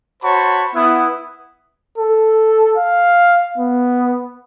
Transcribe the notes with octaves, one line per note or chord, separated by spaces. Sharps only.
F#4 C5 C#5 A5 B5 C#6
B3 E4 D#6
A4
F5
B3